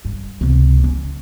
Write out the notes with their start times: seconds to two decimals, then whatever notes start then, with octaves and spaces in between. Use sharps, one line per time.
0.05 G2
0.41 C#2 C3
0.84 C#4